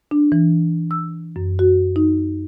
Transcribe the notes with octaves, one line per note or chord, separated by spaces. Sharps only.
D4
E3
E6
F#2
F#4
D#4